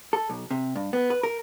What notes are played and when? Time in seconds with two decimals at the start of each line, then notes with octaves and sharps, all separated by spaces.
0.13 A4
0.29 B1
0.51 C3
0.75 G2
0.93 B3
1.10 B4
1.23 A#4